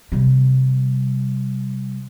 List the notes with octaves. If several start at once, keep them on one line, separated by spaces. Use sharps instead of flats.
C3 G3